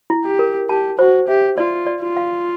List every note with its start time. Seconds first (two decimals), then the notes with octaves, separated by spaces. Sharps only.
0.10 E4
0.25 G4
0.39 A#4
0.69 G4 A5
0.98 F#4 C5
1.28 G4 E5
1.57 F4 D5
1.87 D5
2.02 F4
2.17 F5